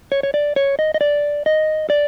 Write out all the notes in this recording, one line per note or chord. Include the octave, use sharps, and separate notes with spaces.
C#5
C#5
D5
C#5
D#5
D#5
D5
D#5
D5